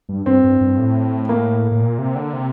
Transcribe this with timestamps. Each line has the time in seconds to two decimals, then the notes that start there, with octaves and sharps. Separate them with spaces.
0.09 G2
0.26 G2 C4
0.44 G2
0.61 G2
0.79 A2
1.29 A#3
1.71 A2
1.82 A#2
1.98 C3
2.15 D3
2.33 C3